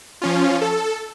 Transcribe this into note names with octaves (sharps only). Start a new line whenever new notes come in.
F3 C#4 F4
A4